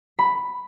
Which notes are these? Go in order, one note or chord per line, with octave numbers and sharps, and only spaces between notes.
B5